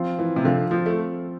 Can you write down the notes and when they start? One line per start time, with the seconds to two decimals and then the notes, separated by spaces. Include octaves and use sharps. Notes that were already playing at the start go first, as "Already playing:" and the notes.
Already playing: F3 C4 F4
0.19 E3
0.36 C3
0.44 D3 F3 C4 F4
0.71 F3
0.86 A3